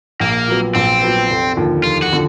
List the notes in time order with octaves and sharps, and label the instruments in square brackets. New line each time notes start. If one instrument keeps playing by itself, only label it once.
[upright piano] A#1 [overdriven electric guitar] A#3
[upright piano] A#2 F#3 B3
[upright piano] A#1 [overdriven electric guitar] C4
[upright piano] A#2 F#3 B3
F1
D#2 D3 F3
[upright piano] F1 [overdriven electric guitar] F4
[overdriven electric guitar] F#4
[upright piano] D3 F3